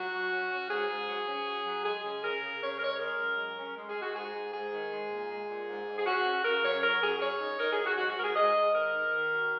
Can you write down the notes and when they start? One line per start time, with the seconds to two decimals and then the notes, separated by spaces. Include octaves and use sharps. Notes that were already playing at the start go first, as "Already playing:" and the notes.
Already playing: F#3 F#4
0.13 C#4
0.31 C#4
0.51 C#4
0.70 G#2 G#4
0.89 G#2
1.09 F#3
1.28 C#4
1.47 F#3
1.65 F#3
1.84 G#3 G#4
2.04 C#3
2.23 C#3 A#4
2.42 C#3
2.62 C#3 C#5
2.77 A#4
2.81 G#3 C#5
2.99 G#3 A#4
3.20 F#2
3.38 G#3
3.57 C#4
3.76 G#3
3.89 G#4
3.96 G#3
4.02 F#4
4.15 G#2 G#4
4.34 G#2
4.53 G#2 G#4
4.72 D#3
4.91 G#3
5.10 A#2
5.29 G#3
5.49 A#2
5.68 G#2
5.87 G#2
5.98 G#4
6.06 C#4 F#4
6.25 C#4
6.44 C#3 A#4
6.63 F#2 C#5
6.82 F#3 A#4
7.02 F#2 G#4
7.21 F#3 C#5
7.40 D#4
7.59 D#4 A#4
7.73 G#4
7.79 F#3
7.85 F#4
7.97 G#2 F#4
8.10 F#4
8.17 G#2 A#4
8.23 G#4
8.36 G#2 D#5
8.55 G#2
8.74 D#3 A#4
8.94 D#4
9.13 D#3
9.32 F#3